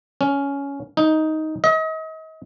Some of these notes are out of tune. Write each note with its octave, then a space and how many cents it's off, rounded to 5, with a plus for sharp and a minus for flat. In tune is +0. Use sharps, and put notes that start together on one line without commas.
C#4 +10
D#4 +10
D#5 +35